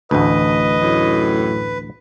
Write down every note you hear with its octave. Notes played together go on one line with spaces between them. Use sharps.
A1 D2 B4 D#5
F#2 A2